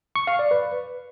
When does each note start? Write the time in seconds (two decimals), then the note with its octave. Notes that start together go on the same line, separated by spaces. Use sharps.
0.16 C#6
0.27 F5
0.39 D5
0.51 B4